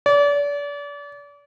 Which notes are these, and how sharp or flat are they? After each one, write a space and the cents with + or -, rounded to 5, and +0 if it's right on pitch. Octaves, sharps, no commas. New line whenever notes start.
D5 -35